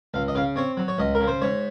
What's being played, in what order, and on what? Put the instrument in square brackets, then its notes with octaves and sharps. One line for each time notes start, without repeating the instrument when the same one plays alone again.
[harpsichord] C#2 F5
D#5
C#3 F5
C4 C#5
F#3
C#5
C#2 D#5
A#4
C#3
C5
G#2 C#5